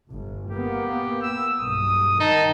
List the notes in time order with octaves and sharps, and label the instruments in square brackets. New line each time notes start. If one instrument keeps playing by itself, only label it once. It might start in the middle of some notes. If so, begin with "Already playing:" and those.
[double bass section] G1
[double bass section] A#3 B3 [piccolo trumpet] G4
[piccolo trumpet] E6
[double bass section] B1 G2 [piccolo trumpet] D#6
[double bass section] D#3 [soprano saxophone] D#4 [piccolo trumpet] A5